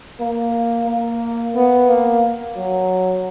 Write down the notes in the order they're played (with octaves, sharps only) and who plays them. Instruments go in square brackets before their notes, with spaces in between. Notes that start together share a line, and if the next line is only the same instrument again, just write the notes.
[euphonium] A#3
A#3
B3
A#3
F#3